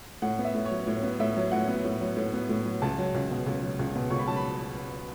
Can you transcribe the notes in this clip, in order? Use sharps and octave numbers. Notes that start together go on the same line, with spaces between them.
A2 F#5
B3
E5
A2
C#5
F#3
A2 C#5
B3
A2 E5
F#3
A2 F#5
B3
A2
F#3
A2
B3
A2
F#3
C#2 A5
F#3
C#2
B2
C#2
F#3
C#2
B2
C#2 C#6
B5
F#3 A5
B5